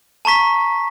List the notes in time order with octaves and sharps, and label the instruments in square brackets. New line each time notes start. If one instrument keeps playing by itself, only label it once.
[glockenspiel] A5 A#5 C#6 B6